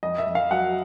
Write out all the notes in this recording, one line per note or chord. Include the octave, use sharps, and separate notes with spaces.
F2 D#5
E5
F2
F5
F#3 F#5